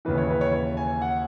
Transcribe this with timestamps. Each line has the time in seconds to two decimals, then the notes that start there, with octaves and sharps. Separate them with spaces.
0.05 D#2 C#3 E3 B4
0.18 C#5
0.30 B4
0.41 C#5
0.77 G#5
1.02 F#5